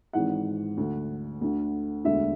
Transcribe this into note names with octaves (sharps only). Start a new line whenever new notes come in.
G#1 G#2 E3 F#5
D2 D3
D2 D3
E1 D2 D3 E5